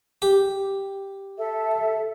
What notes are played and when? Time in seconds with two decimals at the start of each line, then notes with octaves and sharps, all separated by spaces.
0.22 G4
1.37 A4 E5